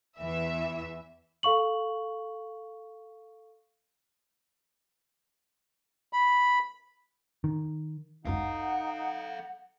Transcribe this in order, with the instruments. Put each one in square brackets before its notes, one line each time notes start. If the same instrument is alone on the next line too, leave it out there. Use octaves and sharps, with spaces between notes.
[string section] E2 E3 E5
[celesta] A4 F5 C#6 F#7
[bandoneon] B5
[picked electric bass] D#3
[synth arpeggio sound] G1 C#2 F#2 [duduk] D#4 [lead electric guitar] A4 F5 [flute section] F#5